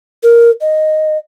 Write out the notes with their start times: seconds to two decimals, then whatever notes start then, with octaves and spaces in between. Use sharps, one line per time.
0.23 A#4
0.61 D#5